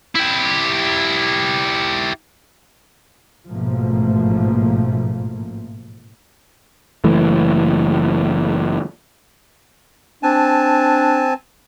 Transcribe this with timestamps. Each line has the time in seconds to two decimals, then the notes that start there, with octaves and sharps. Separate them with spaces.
0.15 E4 G4
3.49 A1 G#2 B2 F3 A3 A#3
7.04 F#1 E3 A3
10.23 C4 D4 G#5 A5